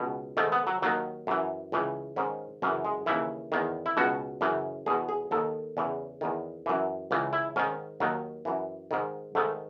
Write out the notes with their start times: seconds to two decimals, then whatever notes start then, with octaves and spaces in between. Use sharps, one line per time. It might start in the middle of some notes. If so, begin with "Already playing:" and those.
Already playing: C#2 B2
0.37 G#2 D#3 A3
0.52 B3
0.67 F#3
0.82 D#2 D#3 F#3
1.27 F#2 E3
1.72 C#2 C#3 E3
2.16 G#2 D#3 C#4
2.62 F#2 C#3 E3 C#4
2.85 G#3
3.06 D#2 C#3 E3 E4
3.52 E2 D#3
3.86 E4
3.97 C#2 B2 F#4
4.41 F#2 C#3 E3
4.86 E2 B2 G#4
5.09 G#4
5.31 D#2 D#3 A4
5.77 E2 C#3 E3
6.21 E2 D#3
6.66 F#2 E3
7.11 C#2 C#3 E3
7.33 E4
7.56 G#2 D#3 C#4
8.00 D#2 D#3 F#3
8.45 F#2 E3
8.91 G#2 D#3
9.35 G#2 D#3 A3